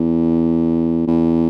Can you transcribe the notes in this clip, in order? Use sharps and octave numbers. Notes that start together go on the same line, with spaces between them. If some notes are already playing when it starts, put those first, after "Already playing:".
Already playing: E2
E2